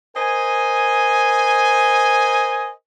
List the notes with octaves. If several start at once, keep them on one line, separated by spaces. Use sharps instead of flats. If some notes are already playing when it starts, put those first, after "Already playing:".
A#4 C5 D#5 G#5